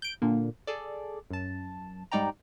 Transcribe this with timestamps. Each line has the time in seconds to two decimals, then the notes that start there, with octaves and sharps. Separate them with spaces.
0.02 G6 D7
0.22 A#2 D3 A#3
0.67 G#4 A4 D5
1.30 F#2 A5
2.12 G#2 G3 D#4 D5 G5 A#5